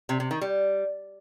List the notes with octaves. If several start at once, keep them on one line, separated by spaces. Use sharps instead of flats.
C3
C3
D#3
G3